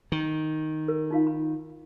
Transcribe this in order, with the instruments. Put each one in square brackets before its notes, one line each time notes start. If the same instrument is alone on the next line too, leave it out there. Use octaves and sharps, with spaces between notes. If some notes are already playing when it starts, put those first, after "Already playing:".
[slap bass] D#3
[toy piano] A#4
D#4 F4 F5
B5